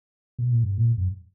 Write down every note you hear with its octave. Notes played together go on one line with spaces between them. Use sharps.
B2
A#2
G2
A#2
F#2